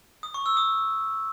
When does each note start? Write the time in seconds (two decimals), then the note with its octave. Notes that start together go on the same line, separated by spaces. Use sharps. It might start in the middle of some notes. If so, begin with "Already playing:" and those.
0.23 D#6
0.34 C#6
0.46 E6
0.57 D#6